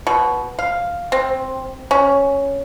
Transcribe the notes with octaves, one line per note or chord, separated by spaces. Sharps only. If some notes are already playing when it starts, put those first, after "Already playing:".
B2
F5
C4
C#4